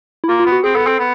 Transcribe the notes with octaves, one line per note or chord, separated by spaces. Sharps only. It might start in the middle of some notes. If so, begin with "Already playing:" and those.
E4
A#3 F4
F4
B3
F#4
C4 G#4
B3 A4
C4 A4
B3